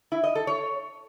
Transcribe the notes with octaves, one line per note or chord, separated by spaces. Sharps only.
E4
D#5
A4
C#5